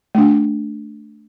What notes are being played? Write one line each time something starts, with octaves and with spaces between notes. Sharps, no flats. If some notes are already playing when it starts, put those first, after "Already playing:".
A3 D4